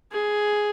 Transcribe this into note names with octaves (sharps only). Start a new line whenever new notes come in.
G#4